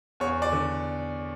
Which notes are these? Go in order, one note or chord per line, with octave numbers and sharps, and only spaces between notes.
E2 C#5
D5
D3